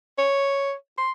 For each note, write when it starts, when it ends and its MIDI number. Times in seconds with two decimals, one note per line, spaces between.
0.18 0.73 73
0.98 1.11 84